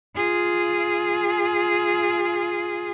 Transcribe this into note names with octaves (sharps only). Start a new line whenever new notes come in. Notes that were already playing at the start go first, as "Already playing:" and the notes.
F4 G#4